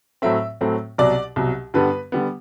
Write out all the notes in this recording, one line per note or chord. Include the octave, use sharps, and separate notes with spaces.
A2 F#3 A3 C4 E5
A2 F#3 A3 C4
C2 B2 F#3 D5
C2 B2 F#3
G2 D3 G3 B3 B4
D3 G3 B3